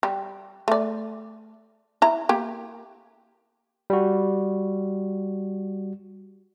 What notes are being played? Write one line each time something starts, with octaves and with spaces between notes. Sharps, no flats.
G3
A3 D5
E4 A#5
A#3 G4
G3 F#4